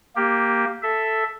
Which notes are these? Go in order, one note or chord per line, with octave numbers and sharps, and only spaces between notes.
A#3 G4
A4 E5